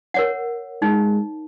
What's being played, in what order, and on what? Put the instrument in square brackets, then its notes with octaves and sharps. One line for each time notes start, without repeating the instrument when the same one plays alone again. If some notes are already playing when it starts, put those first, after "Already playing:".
[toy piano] A#4 C#5 F#5
[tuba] G#3 [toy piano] D#4